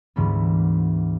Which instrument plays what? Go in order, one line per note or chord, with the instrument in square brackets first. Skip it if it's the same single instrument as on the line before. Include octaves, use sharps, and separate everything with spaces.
[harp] D2 G#2 E3 G3 A3 B3